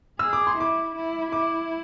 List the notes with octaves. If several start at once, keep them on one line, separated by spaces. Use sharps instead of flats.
G#4 E6
D6
C6
E4 D6
E4
E4 D6